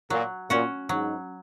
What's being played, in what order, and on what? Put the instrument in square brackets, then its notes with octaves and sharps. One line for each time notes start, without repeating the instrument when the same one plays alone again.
[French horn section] A#2 [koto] F#3
[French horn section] A#2 [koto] C#4 F#4
[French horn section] G#2 [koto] F#3